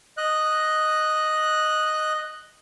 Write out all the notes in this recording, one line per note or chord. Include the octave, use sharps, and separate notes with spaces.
D#5 F#6